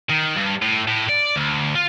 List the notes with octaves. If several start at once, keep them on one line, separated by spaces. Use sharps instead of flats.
D#3
G2
A2
A2
D5
D2
F4